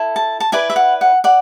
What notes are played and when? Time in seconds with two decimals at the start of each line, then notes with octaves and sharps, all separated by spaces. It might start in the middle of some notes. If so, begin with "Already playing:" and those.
Already playing: E4 A4
0.16 A5
0.40 A5
0.52 E4 B4 D5 G#5
0.70 E5
0.76 F#5
1.01 F#5
1.24 D5 F#5